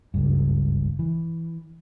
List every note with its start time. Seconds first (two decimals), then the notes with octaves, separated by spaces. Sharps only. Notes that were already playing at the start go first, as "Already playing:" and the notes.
0.14 F#1 C#2 G2
0.99 E3